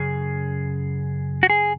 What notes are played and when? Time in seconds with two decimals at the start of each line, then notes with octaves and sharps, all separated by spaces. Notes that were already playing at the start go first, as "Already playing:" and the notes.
Already playing: F#2 C#3 G#4
1.43 F#4
1.50 G#4